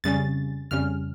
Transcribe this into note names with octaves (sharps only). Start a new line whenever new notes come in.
F2 C#3 G3 C#4 A6
F2 C#3 G3 C#4 F6